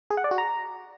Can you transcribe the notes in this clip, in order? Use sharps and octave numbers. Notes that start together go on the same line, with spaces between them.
G#4
F#5
D5
F#4
A#5